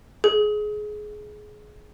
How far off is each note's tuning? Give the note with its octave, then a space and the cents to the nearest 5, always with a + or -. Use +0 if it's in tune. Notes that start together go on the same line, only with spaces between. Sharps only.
G#4 +20